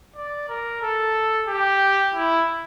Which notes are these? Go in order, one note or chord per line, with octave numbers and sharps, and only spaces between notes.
D5
A#4
A4
G4
E4